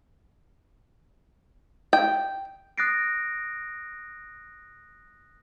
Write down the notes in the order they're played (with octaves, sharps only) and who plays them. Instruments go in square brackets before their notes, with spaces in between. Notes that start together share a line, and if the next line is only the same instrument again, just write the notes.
[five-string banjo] G5
[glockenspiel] D#6 F#6 A6 A#6 C7 D7